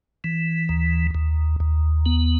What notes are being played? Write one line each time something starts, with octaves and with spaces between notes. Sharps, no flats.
E3
D#2
D#2
D#2
B3